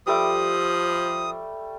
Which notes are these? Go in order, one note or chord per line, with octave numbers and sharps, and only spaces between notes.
F3 G3 A3 D6 D#6